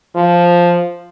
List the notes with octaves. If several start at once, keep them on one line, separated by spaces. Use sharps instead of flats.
F3